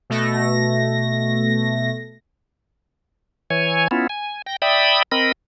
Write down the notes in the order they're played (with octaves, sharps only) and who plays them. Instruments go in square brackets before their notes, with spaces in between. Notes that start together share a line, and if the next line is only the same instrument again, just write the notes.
[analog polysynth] B2 A3 A#6
[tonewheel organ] E3 C#5 G#5
B3 C#4 E4 F4
G#5
G5 A#6
D5 E5 G5 B5 D#6
C4 A#4 D#5 B5